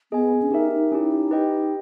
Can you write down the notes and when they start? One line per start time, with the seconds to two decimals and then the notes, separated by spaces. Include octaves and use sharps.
0.12 B3 G#4 D#5 G#5
0.42 C#4
0.52 D#4 G4 A#4 E5
0.72 D#4
0.92 C#4 E4 G4
1.31 G4 B4 D#5 G5